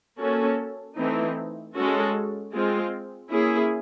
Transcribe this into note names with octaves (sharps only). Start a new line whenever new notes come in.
A#3 C#4 F#4 A4
E3 A3 C4 D#4
G#3 C#4 F#4 A4
G#3 C4 F4
A#3 C#4 E4 G#4